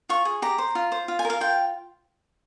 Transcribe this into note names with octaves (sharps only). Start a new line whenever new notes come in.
F4 C#6
G#4
G4 A#5
C5
F4
C5
F4
G#5
A#4
F5
F4 G5